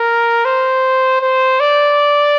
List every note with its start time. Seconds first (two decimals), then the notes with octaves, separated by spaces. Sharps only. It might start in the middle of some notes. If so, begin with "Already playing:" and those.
Already playing: A#4
0.45 C5
1.21 C5
1.60 D5